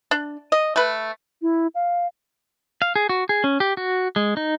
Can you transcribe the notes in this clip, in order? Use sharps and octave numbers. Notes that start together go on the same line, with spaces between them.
D4
D#5
A3 B4
E4
F5
F5
G#4
F#4
G#4
C#4
G4
F#4
G#3
D#4